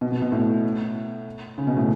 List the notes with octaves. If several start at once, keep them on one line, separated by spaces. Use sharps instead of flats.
B2
B2
B2
A2
C#3
B2
A2